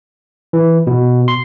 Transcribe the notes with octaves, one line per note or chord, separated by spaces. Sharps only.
E3
B2
C6